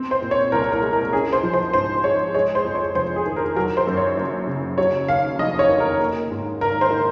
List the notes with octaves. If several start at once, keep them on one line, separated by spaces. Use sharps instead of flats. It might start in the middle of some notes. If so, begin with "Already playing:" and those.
Already playing: C4
C5
A#2
C#5
C2 A#4
A#4
G#3
A#4
C#4 G#4
C5
F3
C5
G#2 C5
G#3 C#5
G#3 C#5
C5
F2
C#5
F1 C5
G#4
D#3
A#4
F#3 A#4
C5
F#2
C#5
F#1
C#3
F#3 C#5
D#2 F5
F1 D#5
C#5
D#3
A#4
A#3
G#2
G#1 A#4
C5
D#3